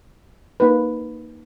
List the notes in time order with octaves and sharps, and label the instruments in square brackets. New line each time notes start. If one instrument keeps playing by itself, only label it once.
[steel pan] A#3 D#4 B4